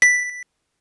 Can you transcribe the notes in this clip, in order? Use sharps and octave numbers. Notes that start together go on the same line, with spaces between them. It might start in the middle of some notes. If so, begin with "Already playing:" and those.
B6